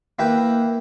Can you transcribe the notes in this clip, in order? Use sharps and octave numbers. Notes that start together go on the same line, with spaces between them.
A#3 E4 B4 G5